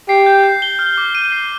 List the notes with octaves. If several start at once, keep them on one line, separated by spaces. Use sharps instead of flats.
G4 C7
G6
G6
G7
F6
D6
D#7
C7